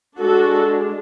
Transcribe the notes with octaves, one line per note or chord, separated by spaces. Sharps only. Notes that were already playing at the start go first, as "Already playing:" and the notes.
G#3 D4 F#4 A4